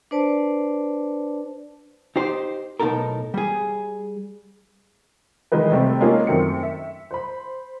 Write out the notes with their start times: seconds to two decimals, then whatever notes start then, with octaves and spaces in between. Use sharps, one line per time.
0.11 D4 B4 C5 D5 A5
2.16 D#4 G4 C5
2.80 B1 A2 D#4 A4 A#4
3.34 G3 G#4
5.52 D#3 E3 G#3 D#4 B4
5.71 C3 G3 A3 C4
6.01 G#3 A#3 C#4 D#4 F4 G#4
6.27 F#2 D#3 A3 C4 C#7
6.63 E5
7.11 C5 B5